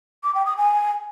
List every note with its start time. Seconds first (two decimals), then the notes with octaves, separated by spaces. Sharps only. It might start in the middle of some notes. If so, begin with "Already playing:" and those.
0.24 D6
0.35 G5
0.46 D#6
0.57 G#5